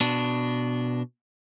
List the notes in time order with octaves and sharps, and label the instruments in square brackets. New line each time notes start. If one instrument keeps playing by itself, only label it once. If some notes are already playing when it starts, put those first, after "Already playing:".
[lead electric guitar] B2 D4